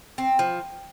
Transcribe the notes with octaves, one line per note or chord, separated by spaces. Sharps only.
C4
F3